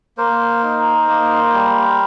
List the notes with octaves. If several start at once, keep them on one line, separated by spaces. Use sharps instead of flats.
A#3 A#4 C5
D#4
A#3
G3